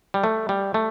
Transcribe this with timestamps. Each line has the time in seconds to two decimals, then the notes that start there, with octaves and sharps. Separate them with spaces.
0.14 G3
0.24 A3
0.49 G3
0.74 A3